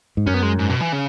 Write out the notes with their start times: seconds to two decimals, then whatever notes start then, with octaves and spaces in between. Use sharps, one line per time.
0.17 G#2
0.27 F#2 C#4
0.34 B3
0.43 G#3
0.59 G#2
0.70 B2
0.81 E3
0.93 C#3